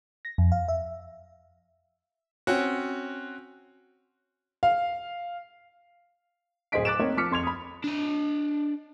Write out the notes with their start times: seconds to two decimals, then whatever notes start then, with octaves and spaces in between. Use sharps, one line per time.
0.25 A#6
0.38 F2
0.52 F5
0.68 E5
2.47 C4 C#4 F#4
4.63 F5
6.72 D1 G#4 C5 D#5 B6 D7
6.85 D6 F#6 A6 D7 E7
6.99 A#3 C4 D#4 A#4 C#5 D#5
7.17 F3 D6 F6 B6 C#7
7.31 F2 C6 G#6 F7
7.43 B5 D#6
7.84 D4 D#5